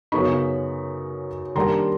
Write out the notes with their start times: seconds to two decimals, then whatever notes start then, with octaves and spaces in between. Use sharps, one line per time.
0.12 F#2 C#3 F#3 B3 D#4 B5 C#6
1.55 D#3 G3 A#3 D4 A#5 C6